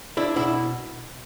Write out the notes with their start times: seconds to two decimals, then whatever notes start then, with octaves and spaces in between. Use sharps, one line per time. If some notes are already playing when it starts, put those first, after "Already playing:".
0.17 D4 E4
0.36 B2 E4